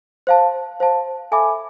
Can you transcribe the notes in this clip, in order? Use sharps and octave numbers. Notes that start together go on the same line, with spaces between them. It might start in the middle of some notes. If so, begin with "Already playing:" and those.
C5 F5 A5
C5 F5 A5
A4 E5 G#5 B5 D6